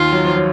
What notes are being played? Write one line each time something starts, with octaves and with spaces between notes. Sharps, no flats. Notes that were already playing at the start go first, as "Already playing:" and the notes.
Already playing: D#2 D#3 F4
F#3
F3
F#3